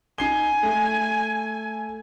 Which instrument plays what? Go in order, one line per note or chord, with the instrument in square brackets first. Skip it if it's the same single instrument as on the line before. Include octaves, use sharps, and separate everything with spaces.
[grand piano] D#4 C7 G7 [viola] G#5
[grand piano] A3